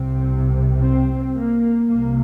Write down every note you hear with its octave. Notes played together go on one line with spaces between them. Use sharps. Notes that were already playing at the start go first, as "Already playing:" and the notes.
Already playing: C2 C3 C4
C4
A#3
C2 C3 A#3